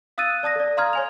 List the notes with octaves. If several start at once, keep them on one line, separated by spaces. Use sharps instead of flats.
F5 D#6 E6 F#6 A6 D#7
D5 A5 D#6 A#6
A4 D5
F5 A#5 C6 D#6 F6 G#6
C#5 G#5 F7